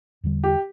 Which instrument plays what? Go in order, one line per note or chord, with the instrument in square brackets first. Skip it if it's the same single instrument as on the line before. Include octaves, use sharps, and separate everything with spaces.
[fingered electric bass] E2 D3 G3
[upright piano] G4